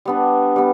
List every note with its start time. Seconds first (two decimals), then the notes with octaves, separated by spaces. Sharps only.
0.05 G3 B3 D4
0.56 G3 B3